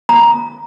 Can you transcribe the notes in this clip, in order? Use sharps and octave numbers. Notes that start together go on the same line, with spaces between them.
A#5